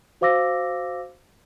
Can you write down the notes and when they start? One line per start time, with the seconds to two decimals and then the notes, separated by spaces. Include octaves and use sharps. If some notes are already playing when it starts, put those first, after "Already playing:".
0.21 F#4 C5 F5 D6 E6 A#6